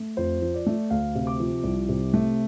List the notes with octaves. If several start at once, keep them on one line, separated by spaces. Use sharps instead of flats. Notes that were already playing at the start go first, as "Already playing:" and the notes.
Already playing: A3
F2 C5
F3
D5
A3
D2 F5
C3
D6
F3
C2
C3
A3